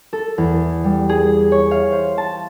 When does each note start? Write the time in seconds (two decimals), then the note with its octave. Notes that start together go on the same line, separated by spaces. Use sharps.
0.13 A4
0.38 E2
0.84 G3
1.09 G#4
1.52 C#5
1.71 F5
1.92 C5
2.18 A5